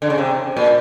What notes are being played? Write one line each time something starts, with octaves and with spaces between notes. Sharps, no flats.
D3
C#3
C3
A#2